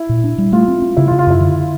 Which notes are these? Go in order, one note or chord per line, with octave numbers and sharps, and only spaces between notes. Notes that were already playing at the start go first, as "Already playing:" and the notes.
Already playing: E4
A#2
D4
G3
A3 F4
C4
C4
C#3 E4
F4
C#3
F4
F#2 E4
D3